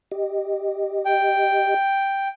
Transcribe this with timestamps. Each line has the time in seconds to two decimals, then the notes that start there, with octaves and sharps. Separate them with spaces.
0.12 G4 D#5
1.05 G5